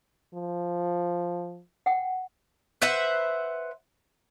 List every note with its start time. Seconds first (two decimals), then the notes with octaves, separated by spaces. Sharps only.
0.35 F3
1.86 F#5 G5
2.82 B4 C5 E5 F#5